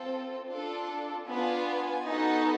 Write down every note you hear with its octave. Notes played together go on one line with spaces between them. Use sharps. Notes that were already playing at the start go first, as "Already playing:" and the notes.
Already playing: C4 F4 A4
D4 F4 A4
B3 D4 F4 G#5
B3 D#4 F#4 A4